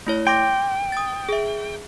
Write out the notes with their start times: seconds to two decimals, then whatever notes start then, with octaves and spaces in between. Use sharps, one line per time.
0.07 A3 E4 C#5
0.27 G5 C6 D6 A#6
0.92 D#6 A6
1.29 G#4 E5